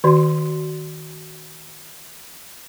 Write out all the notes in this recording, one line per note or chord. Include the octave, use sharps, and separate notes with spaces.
D#3 F#4 D5 C6